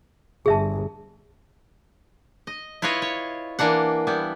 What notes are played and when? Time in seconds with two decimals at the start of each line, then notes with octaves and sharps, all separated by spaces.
0.46 G1 G#4 E5 A5
2.47 D#5
2.82 E4 F4 B4 C#5 D#5
3.02 C#5
3.59 E3 A#3 D4 F#5
4.07 G3 B3 E4